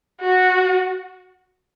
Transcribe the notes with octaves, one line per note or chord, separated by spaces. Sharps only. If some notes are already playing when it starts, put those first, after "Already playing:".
F#4